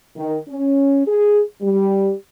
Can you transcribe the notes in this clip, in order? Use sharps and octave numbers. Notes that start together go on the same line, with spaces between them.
D#3
C#4
G#4
G3